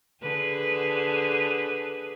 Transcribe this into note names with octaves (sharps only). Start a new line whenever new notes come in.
D3 G#4 B4